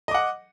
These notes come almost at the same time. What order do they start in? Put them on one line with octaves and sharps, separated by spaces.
D#5 D6 F#5